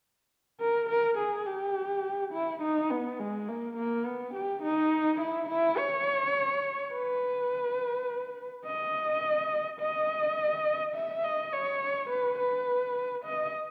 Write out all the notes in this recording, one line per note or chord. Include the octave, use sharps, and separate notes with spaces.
A#4
A#4
G#4
G4
E4
D#4
B3
G#3
A#3
A#3
B3
G4
D#4
E4
E4
C#5
B4
D#5
D#5
E5
D#5
C#5
B4
B4
D#5